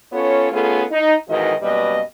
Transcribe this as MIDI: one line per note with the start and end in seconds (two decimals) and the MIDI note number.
0.13 0.52 59
0.13 0.52 61
0.13 0.52 65
0.13 0.52 69
0.13 0.52 73
0.52 0.84 57
0.52 0.84 59
0.52 0.84 61
0.52 0.84 65
0.52 0.84 68
0.52 0.84 69
0.91 1.14 63
1.28 1.54 41
1.28 1.54 44
1.28 1.54 51
1.28 1.54 52
1.28 1.54 66
1.28 1.54 75
1.61 1.99 42
1.61 1.99 47
1.61 1.99 55
1.61 1.99 58
1.61 1.99 71
1.61 1.99 75